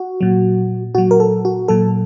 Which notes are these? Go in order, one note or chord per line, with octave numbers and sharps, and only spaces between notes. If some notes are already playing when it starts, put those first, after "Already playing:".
Already playing: F#4
A#2 F#3
A#2 F#3 F#4
A#4
A4
F#4
A#2 F#3 A4